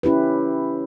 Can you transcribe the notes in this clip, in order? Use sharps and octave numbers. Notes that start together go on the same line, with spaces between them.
C#4 E4 G4 B4